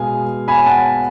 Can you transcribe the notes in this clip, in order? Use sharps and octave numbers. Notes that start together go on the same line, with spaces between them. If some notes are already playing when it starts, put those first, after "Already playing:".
Already playing: B2 G#3 B3 F5 G#5
G#5 B5
F#5 A5